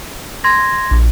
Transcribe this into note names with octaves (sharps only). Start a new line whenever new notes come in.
C6 G#6 A#6
A#1